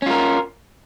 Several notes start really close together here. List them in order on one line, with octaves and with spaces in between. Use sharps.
C#4 F4 A#4